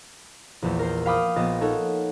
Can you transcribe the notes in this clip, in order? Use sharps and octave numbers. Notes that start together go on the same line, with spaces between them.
A#1 E2
A#4 C5
F5 G5 B5 D6 D#6 F6
A#1 B3 D#5 A6
D#4 A4 C#5 F#5